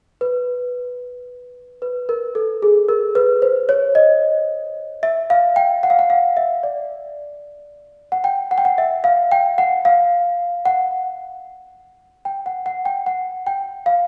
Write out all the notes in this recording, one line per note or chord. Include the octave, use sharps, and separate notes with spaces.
B4
B4
A#4
A4
G#4
A#4
B4
C5
C#5
D#5
E5
F5
G5
F#5
F5
F#5
F5
E5
D5
F#5
G5
F#5
G5
F#5
E5
F5
G5
F#5
F5
F#5
G5
F#5
F#5
G5
F#5
G5
F5